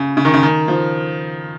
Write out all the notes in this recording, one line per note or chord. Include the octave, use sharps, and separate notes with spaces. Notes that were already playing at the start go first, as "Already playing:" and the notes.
Already playing: C#3
C#3
D#3
C#3
D#3
F3